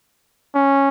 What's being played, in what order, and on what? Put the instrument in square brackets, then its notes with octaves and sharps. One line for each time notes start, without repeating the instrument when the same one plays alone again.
[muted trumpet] C#4